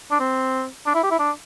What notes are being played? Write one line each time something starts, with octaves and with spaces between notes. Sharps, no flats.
D4
C4
D4
E4
G4
E4
D4